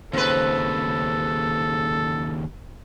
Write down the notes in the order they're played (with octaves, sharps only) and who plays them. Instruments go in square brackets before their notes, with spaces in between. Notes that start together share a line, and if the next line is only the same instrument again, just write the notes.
[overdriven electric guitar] D#2 C#3 [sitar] C4 B4 [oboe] A4